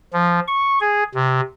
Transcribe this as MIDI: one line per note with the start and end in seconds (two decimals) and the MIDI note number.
0.13 0.40 53
0.48 0.79 85
0.80 1.04 68
1.15 1.41 48